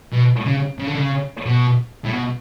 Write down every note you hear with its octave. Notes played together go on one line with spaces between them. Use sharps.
B2
C#3
C#3
D3
C#3
B2
A2
B2